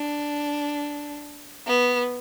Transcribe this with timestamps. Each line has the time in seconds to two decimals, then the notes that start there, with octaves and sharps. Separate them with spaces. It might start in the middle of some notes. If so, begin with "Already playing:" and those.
Already playing: D4
1.67 B3